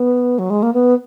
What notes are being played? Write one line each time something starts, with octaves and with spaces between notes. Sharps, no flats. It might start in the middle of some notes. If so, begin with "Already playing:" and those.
Already playing: B3
F#3
G#3
A#3
B3